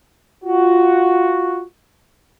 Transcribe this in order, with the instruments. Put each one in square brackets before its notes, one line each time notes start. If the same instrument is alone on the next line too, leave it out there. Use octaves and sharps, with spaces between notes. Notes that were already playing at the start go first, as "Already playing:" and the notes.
[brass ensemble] F4 F#4